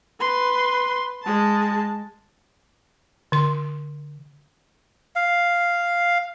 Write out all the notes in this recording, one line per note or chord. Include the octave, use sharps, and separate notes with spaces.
B4 C6
G#3 A5
D3 C6
F5